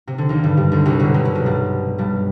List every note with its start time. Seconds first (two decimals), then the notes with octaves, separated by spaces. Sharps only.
0.07 C3
0.18 D3
0.29 D#2 D#3
0.44 G2 G3
0.57 G2 G3
0.72 D2 D3
0.86 C2 C3
1.00 B1 B2
1.14 C2 C3
1.25 C2 C3
1.35 B1 B2
1.46 G2 G3
1.98 G2 G3